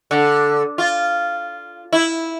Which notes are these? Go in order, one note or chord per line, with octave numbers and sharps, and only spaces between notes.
D3
F4
E4